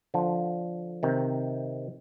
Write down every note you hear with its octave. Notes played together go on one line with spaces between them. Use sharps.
D3 F3
C3 D#3